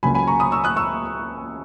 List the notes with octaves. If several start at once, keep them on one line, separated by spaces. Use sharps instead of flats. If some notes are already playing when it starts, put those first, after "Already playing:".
C#2 C#3 F#3 A#3 G#5 B5
G#5 B5
A#5 C#6
B5 D#6
C#6 E6
D#6 F#6
C#6 E6